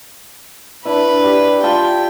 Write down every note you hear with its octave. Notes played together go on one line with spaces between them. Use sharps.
D4 E4 B4
G4
F4 E5 G5 A5